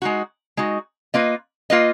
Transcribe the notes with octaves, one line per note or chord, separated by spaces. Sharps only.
G#3 D#4 F#4
G#3 D#4 F#4
A#3 F4 B4 D#5
A#3 F4 B4 D#5